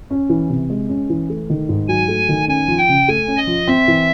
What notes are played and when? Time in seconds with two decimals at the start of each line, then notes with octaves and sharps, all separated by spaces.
0.11 C#4
0.29 E3
0.49 C3
0.70 G#3
0.89 C#4
1.10 E3
1.30 A3
1.50 D#3
1.69 G#2
1.88 F#3 G#5
2.08 A3
2.29 D#3
2.48 C#4 G#5
2.68 F3
2.78 G5
2.89 C#3
3.08 A3 G#5
3.28 C#4
3.37 D#5
3.47 F3
3.67 C4 E5
3.88 E3